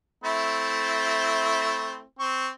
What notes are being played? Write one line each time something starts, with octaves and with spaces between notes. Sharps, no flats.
A3 C4 E4
C4 C#6